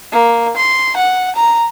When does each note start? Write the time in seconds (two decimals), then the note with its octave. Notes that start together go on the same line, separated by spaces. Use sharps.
0.12 A#3
0.57 C6
0.97 F#5
1.36 A#5